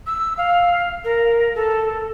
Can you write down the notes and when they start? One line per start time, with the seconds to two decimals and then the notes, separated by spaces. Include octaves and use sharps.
0.07 E6
0.37 F5
1.04 A#4
1.55 A4